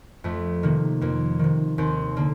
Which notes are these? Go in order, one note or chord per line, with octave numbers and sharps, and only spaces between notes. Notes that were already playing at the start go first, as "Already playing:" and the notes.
F2 A3
C3 D#3 A#3
F2 A#3
C3 D#3
D#2 C4
D3 A#3